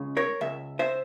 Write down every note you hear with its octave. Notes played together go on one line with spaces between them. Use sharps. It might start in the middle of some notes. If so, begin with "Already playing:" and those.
Already playing: C#2 C#3 G#3
A#4 C#5
C#2 C#3 E5
C5 E5